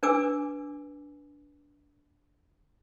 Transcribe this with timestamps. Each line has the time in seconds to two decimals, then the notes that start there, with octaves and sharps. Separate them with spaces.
0.03 D4 B4 G#5 D6 E6